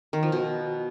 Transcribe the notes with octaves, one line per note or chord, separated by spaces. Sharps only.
D#3
F3
B2